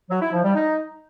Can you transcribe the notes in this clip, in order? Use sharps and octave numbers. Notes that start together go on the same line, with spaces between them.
F#3
E4
F3
G3
D#4